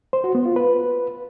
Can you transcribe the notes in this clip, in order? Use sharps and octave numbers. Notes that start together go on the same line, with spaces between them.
C5
F#4
B3
F4
B4